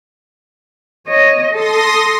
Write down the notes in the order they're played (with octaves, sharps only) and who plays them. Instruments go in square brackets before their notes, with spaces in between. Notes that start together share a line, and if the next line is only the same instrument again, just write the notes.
[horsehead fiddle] C#5 D#5
[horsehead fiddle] A4 [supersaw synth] C6 D#6 A#6